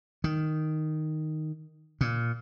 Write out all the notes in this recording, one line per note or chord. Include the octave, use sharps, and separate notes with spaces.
D#3
A#2